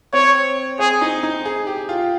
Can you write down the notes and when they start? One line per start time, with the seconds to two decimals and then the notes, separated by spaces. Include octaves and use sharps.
0.13 C4 C#5
0.79 C4 G#4
1.01 D#4
1.23 D#4
1.45 G#4
1.67 G4
1.89 F4